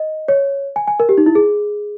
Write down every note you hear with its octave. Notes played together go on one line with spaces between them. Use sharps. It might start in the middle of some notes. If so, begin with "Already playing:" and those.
Already playing: D#5
C#5
G#5
G#5
A#4
G4
D#4
E4
G#4